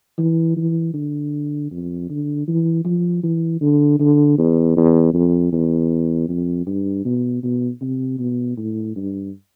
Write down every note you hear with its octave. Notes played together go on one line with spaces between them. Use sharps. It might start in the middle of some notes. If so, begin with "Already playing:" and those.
E3
E3
D3
F2
D3
E3
F3
E3
D3
D3
E2
E2
F2
E2
F2
G2
B2
B2
C3
B2
A2
G2